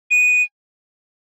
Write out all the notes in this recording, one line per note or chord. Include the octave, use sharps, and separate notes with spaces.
D#7